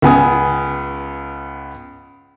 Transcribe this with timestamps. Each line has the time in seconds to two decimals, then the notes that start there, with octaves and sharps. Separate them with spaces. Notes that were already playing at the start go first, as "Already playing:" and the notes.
0.02 C#2 B3 G#5 D#6